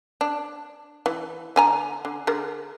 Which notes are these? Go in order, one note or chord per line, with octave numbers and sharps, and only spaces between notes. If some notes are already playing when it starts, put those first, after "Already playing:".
D4
E3
D3 G#5 A#5
D3
D3 G#4 A#4